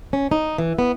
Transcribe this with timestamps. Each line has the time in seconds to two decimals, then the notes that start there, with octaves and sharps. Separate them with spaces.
0.13 C#4
0.31 D#4
0.58 E3
0.79 B3